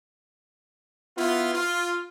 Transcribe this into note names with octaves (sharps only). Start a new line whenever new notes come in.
B3 E4 F4
F4